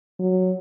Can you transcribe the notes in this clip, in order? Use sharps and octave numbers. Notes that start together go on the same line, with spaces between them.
F#3